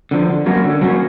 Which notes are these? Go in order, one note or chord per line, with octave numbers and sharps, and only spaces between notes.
D3 F3
D3
F#3 A#3 C#4 F#4
D3
F#3 A#3 C#4 F#4